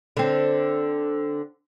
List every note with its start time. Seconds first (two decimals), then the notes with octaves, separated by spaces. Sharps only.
0.17 D3 C4